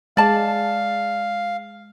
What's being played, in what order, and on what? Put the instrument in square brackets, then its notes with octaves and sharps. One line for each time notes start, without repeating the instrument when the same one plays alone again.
[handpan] G#3 [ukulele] D5 A5 [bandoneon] F5